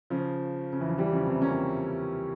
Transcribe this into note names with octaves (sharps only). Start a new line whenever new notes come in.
C#3 F3
C#3
E3
F3
E3 G3
C#3 F3
C3 E3
A#3 C#4